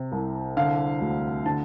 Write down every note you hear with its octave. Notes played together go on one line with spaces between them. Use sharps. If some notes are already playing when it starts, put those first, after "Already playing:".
Already playing: C3
C2
D3 F5
D2
D3 A5